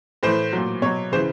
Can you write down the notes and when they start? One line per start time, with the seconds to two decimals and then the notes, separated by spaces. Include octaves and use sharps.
0.23 A2 E3 C5
0.53 A#2 F#3
0.82 B2 F#3 C#5
1.12 C#3 E3 C5